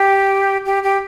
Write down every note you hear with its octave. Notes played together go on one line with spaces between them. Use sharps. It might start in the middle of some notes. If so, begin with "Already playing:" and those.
Already playing: G4
G4
G4